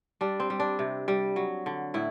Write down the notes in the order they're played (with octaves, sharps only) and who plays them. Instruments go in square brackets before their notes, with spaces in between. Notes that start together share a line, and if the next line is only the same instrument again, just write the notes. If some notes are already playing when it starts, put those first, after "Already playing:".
[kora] G3 D4
C4
G3
D4
C3
G3
F#3
D3
A2 E4